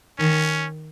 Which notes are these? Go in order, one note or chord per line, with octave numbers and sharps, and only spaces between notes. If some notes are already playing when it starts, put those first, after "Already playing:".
D#3 C#4